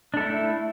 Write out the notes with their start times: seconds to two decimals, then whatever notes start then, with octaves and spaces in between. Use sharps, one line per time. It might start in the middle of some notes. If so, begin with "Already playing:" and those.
0.14 D4
0.17 A4
0.20 E4
0.23 A3